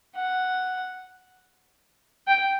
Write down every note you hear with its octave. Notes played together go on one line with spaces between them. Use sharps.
F#5
G5